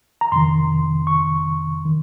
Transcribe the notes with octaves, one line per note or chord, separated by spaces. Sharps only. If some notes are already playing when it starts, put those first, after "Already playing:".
A#5
F2 C3 D#3 C6
C#6
D#3